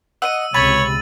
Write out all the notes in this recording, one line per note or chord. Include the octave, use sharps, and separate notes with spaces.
D#5 F#5 E6 D#7
C#2 C3 C#5 B5 A6 F#7